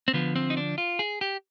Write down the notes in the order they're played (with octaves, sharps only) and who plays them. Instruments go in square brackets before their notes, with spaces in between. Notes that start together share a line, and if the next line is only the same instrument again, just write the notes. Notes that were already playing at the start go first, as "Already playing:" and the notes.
[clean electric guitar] C4
D3 F3 B3
C4
D#4
D4
F4
G#4
G4